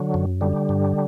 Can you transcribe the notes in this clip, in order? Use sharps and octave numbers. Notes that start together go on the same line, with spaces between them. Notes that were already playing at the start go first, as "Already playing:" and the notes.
Already playing: D3 F#3
F#2
D3 G3
G2